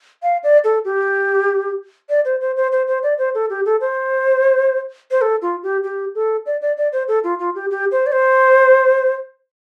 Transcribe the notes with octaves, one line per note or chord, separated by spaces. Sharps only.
F5
D5
A4
G4
D5
C5
C5
C5
C5
C5
D5
C5
A4
G4
A4
C5
C5
A4
F4
G4
G4
A4
D5
D5
D5
C5
A4
F4
F4
G4
G4
C5
D5
C5